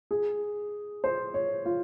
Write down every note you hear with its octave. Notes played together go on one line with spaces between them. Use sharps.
G#4
C5
C#5
F4